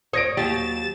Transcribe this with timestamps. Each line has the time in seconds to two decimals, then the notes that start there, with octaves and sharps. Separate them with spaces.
0.13 C#5 D#6 A#6 D7
0.37 D#2 F#3 G4 A6 E7